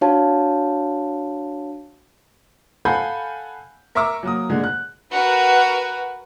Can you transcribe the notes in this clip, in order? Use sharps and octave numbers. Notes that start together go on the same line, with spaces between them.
D4 F#4 C#5 F5 A5
A4 F5 F#5 G#5 B5 G6
A#4 E5 A#5 C#6 D6 E6
F#3 A#3 D#6
A#2 D3 G#3
F#6
F#4 A#4 B4